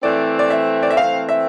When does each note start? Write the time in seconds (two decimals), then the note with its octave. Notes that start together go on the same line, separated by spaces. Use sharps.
0.03 E3 A3 C4 D5
0.39 D5
0.50 E5
0.83 D5
0.91 E5
0.97 E3 A3 C4 F5
1.29 E5